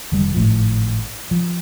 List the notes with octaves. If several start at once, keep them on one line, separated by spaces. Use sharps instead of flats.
F1 D3 D#3 G3
G#1 A2 F3
F3